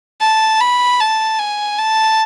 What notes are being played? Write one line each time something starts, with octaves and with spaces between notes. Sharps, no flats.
A5
B5
A5
G#5
A5